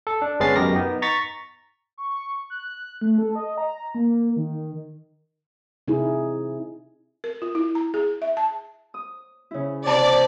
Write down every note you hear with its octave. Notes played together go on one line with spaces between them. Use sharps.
A4
D4
G1 G#3 B3 C#4 A6 C7
F#2 B2 G4 A#4 A#6
B3 D#4
A#5 C#6 A6 B6
C#6
F#6
A3
A4
D#5
A#5
A#3
D#3
C3 D#4 E4 G#4
A#4
F4
E4
A#5
G#4
E5
A5
D#6
C#3 E4
C3 D5 A5